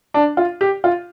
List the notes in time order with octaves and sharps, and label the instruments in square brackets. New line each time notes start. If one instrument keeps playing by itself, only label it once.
[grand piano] D4
F4
G4
F4